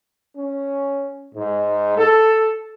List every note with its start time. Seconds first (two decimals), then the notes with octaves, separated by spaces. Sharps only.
0.36 C#4
1.35 G#2
1.98 A4